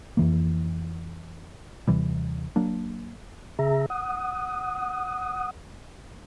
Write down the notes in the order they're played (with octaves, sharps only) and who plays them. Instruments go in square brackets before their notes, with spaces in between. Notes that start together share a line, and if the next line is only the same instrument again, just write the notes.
[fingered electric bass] F2 E3 A#3
[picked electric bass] D#2 C3 E3 G3
F#3 A#3 D4
[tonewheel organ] C#3 G#4 E5 A#5
F#5 D#6